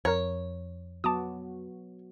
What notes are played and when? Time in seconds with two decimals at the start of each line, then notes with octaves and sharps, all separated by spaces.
0.05 F2 A#4 C#5 A#5
1.04 F#3 B3 F#4 A5 D6 D#6